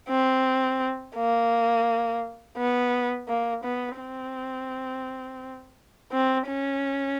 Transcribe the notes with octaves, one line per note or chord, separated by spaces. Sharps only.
C4
A#3
B3
A#3
B3
C4
C4
C#4